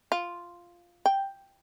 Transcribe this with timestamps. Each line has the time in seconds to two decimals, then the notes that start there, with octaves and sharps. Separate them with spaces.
0.12 F4
1.06 G5